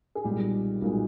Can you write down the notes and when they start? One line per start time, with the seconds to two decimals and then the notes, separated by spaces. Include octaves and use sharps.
0.15 G#4
0.24 B1 A#2 G3 G#3 G4
0.82 B1 A#2 G#3